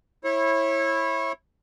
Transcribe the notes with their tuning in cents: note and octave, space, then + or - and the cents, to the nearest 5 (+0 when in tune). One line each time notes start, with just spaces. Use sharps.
E4 +0 C#5 -30